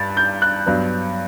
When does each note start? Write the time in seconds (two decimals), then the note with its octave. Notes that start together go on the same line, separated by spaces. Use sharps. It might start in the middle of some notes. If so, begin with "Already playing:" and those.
Already playing: G2 A6
0.17 G6
0.42 F#6
0.66 G2 F#3 B3